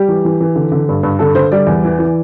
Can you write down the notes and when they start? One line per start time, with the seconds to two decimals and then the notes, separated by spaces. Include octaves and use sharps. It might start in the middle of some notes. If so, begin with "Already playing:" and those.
Already playing: G3 G4
0.08 E3
0.25 E3
0.40 E3
0.56 D3
0.72 D3
0.88 G2
1.03 G2
1.19 D3 A4
1.35 D3 C5
1.52 G3 D5
1.67 E2
1.84 E3
1.99 E3